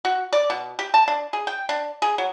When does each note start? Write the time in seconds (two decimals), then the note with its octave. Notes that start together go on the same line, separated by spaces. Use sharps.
0.05 F#4
0.33 D5
0.50 B2
0.79 G4
0.94 A5
1.08 D4
1.33 G#4
1.47 G5
1.69 D4
2.02 G#4
2.18 F#3